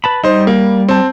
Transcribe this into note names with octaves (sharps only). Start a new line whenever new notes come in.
B4 A5 B5
G3 D#4 C5
A#3
C4 A5